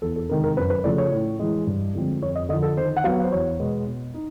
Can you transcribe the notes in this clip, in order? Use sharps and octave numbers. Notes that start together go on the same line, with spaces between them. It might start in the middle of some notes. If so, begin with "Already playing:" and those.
E2 A4
A4
C3 D#3 G#3 A#4
A#4
F#2 B4
B4
C#3 F3 A3 D5
C#5
A2
E3 G#3
G2
D3 F3 G#3 C4
F2 C#5
D#5
D3 F3 D#5
A4
D#3 C5
F#5
F#3 B3 F5
C5
E2 C#5
B2 G#3 B3
B2
D#4